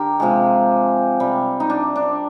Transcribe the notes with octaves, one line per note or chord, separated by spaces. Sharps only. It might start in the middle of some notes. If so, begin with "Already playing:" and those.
Already playing: D3 G4 A#4
C3 F3 G#3
C3 G3
D#4
D4
D4